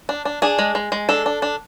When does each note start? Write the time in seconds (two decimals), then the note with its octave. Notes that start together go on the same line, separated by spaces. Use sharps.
0.09 D4
0.25 D4
0.42 D4 G#4
0.59 G#3
0.75 G#3
0.92 G#3
1.09 D4 A4
1.26 D4
1.42 D4